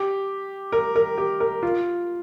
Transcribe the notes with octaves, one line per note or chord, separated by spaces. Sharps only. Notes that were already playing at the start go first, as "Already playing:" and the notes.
Already playing: G4
A#4
A#4
G4
A#4
F4